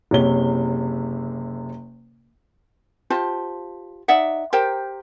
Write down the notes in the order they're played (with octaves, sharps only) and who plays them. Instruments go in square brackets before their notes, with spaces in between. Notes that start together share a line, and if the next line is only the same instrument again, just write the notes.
[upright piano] F#1 C3 C#5 G7
[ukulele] F4 G4 C5 A5
D#4 D5 E5 F#5
G4 A#4 C5 G5